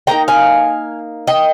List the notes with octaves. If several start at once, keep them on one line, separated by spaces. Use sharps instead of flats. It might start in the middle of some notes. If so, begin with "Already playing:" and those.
D#3 A#3 D#4 G5 A#5
F5 G#5
D#5 G5